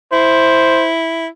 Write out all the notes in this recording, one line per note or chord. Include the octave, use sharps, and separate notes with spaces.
E4 C5